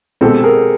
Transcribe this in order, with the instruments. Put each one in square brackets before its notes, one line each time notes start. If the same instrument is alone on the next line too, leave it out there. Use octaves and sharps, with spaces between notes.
[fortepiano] B2 G#3 C4 [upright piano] G4 A4
[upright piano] G#4 A#4